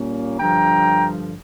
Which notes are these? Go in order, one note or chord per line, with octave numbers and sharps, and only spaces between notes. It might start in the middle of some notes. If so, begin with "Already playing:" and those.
Already playing: A#2 G3 A#3 C#4
G2 D3 F3 G5 A#5